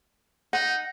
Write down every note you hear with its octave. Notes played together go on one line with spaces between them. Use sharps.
D#4 F#5